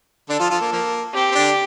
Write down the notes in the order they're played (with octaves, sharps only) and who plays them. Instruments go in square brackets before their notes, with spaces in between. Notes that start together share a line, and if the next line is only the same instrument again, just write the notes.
[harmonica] D3 D4 [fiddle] A4
[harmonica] F3 F4
F3 F4
A#3
F3 A#3
[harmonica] C4 [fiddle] G4
[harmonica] C4
D3 D4